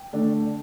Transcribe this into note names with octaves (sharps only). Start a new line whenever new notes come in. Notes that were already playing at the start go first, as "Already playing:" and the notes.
Already playing: G5
D3 A3 D4